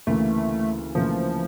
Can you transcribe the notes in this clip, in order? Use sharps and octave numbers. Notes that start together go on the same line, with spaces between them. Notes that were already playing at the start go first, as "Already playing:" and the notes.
D2 C#3 E3 A3 A#3
D2 C#3 E3 F3 A#3